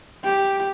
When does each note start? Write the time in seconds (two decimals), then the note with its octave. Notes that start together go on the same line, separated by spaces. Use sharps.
0.24 G4